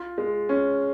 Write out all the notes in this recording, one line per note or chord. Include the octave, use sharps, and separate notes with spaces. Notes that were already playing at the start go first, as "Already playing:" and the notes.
Already playing: F4
G#3
C#4